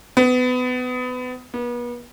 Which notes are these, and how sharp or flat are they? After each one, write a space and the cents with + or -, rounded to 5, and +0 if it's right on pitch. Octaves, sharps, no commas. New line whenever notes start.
B3 +25
B3 -40